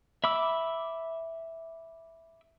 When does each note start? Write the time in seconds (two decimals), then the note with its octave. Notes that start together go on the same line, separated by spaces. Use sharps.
0.24 E5 B5 D6 E6